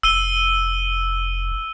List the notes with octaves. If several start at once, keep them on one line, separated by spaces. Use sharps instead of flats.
F1 E6 D#7 G7